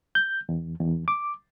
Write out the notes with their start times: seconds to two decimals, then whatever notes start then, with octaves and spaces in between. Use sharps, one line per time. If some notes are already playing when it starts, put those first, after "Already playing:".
0.15 G6
0.49 E2
0.80 E2
1.08 D6